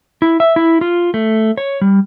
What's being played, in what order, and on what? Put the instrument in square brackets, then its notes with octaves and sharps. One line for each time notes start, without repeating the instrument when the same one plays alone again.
[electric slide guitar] E4
E5
E4
F4
A3
C#5
G3